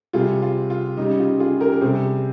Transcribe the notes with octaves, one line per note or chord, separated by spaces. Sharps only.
C3 G3 F4 G#4
F4
F4
C#3 G3 D#4
F4
F4 G#4
G4 A#4
A#4
C3 G3 G#4 C5